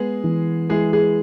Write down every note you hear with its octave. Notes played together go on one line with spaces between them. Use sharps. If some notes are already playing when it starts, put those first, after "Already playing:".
Already playing: G#3 B3 G#4
E3
G#3 E4 G#4
G#3 G#4